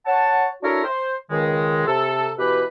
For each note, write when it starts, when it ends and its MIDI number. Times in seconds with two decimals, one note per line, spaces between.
0.06 0.47 73
0.06 0.47 78
0.06 0.47 81
0.63 0.83 62
0.63 0.83 64
0.63 0.83 66
0.63 0.83 69
0.63 0.83 70
0.63 0.83 73
0.84 1.13 72
1.31 1.84 37
1.31 1.84 51
1.31 1.84 56
1.86 2.29 48
1.86 2.29 69
2.38 2.63 47
2.38 2.63 52
2.38 2.63 67
2.38 2.63 71